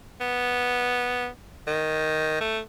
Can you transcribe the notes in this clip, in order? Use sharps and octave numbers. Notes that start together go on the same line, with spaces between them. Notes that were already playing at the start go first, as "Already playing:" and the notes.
B3
D#3
A3